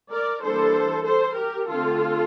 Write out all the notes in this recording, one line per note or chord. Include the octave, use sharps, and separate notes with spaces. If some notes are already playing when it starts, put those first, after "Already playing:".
A#4 D5
E3 G3 A#3 D4 A4 C5
A4 C5
G4 A#4
D3 A3 C4 F4 A4